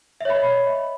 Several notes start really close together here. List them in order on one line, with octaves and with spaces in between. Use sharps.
E5 C#5 B5 D#5